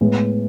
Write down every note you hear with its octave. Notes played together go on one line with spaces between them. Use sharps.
A2 G#3 B3